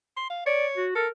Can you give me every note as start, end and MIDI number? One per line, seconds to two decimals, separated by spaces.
0.17 0.29 84
0.30 0.46 77
0.46 0.85 73
0.46 0.66 74
0.77 0.94 66
0.95 1.07 69
0.95 1.08 70